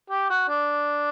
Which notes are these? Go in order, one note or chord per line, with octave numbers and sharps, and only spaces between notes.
G4
F#4
D4